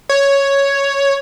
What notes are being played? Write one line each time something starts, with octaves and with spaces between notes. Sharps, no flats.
C#5